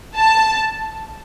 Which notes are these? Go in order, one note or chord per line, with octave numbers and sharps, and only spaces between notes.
A5